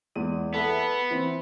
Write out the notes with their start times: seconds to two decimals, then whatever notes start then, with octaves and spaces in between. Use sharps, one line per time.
0.16 E2 G#3 D#7
0.54 B3 A4 E5
1.11 E3 C4